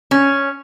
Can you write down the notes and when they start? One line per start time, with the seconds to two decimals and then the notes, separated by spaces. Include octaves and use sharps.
0.11 C#4